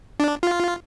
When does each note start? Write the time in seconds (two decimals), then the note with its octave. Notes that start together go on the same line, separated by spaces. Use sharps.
0.20 D4
0.43 F4